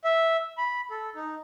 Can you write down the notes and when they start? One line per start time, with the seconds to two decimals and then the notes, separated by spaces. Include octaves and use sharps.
0.04 E5
0.58 B5
0.90 A4
1.15 D#4